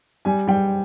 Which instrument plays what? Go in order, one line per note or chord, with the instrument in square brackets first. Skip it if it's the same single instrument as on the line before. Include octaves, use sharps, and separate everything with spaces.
[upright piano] G3 G#5
G3 G5